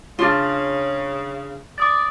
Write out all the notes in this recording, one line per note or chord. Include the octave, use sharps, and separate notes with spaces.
C#3 D4 F4
D5 D6 D#6 A6